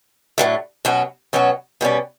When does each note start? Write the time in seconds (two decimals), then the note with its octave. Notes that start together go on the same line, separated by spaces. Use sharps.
0.38 A2 F#3 A3 D4
0.85 B2 F#3 C#4 F#4
1.33 B2 F#3 C#4 F#4
1.81 B2 G3 C#4